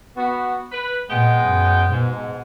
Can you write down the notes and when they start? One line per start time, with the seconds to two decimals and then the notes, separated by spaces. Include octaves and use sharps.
0.17 B3 F#4
0.72 B4
1.10 A#2 G#3 B3 G5
1.46 F#2
1.91 G#2 B2